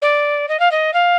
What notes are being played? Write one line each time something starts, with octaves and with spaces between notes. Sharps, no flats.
D5
D#5
F5
D#5
F5